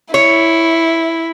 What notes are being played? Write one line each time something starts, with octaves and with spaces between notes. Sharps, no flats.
E4 C#5